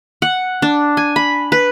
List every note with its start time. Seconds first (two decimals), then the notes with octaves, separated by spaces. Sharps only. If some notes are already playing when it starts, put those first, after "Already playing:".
0.22 F#5
0.62 D4
0.97 G#5
1.16 B5
1.52 B4